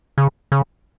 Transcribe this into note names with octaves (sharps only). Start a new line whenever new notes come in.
C#3
C#3